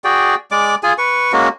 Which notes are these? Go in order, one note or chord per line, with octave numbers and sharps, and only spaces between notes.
F#4 G#4 D5 G5
G#3 D5 D6
F4 G#4 G#5
B4 C#6
G#3 A#3 C#4 F#4